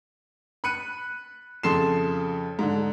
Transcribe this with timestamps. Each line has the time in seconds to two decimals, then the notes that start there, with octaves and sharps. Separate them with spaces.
0.64 B5 F#6 C#7 D#7
1.63 F2 C#3 A4 C6 C7 E7
2.59 G#2 D3